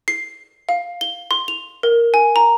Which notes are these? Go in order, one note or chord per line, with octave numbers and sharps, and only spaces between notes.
C7
F5
G7
C6
F7
A#4
G#5
A#5